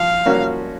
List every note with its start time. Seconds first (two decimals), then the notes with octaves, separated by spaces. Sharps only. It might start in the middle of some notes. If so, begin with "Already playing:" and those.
Already playing: F3 F5
0.26 A#3 C#4 F#4